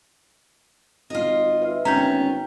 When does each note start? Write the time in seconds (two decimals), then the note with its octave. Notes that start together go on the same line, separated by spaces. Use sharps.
1.10 G#1 F4 D#5
1.62 B4 E5
1.85 G#1 D2 B3 C#4 G5 A#5 G6 B6